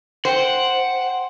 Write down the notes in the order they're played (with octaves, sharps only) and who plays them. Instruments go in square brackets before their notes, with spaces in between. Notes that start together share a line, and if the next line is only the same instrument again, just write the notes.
[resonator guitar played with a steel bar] C5 [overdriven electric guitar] F#5 [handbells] G5 C6